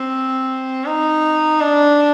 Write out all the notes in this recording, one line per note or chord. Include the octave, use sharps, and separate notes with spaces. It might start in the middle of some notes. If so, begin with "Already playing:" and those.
Already playing: C4
D#4
D4